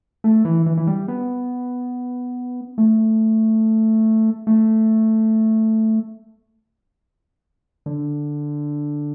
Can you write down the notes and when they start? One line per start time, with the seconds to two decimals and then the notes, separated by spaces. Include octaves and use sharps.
0.24 A3
0.45 E3
0.66 E3
0.77 E3
0.87 G3
1.08 B3
2.78 A3
4.47 A3
7.86 D3